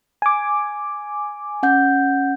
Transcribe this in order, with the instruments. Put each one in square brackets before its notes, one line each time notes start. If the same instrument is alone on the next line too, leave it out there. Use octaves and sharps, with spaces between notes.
[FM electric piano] G#5 D6
[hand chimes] C#4 F#5 G6